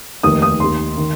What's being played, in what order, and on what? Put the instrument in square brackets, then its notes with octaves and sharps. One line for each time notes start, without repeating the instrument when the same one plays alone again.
[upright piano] F1 D#2 D#3 D#6
D#6
D#2 D#3 C6
D#3